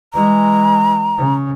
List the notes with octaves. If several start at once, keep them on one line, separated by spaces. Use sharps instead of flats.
E3 G#3 A#5
C#3